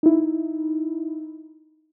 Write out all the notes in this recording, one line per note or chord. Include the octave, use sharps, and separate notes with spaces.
D#4 E4